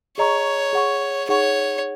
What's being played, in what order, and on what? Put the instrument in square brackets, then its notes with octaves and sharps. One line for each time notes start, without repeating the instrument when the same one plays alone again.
[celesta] G#4 D#5 A#5 C#6 [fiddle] C#5
[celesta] G#4 F#5 C#6
[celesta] D#4 G#4 F#5 C#6 [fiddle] C#5